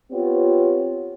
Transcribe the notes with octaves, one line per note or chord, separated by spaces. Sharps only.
B3 C4 F4 G4 C#5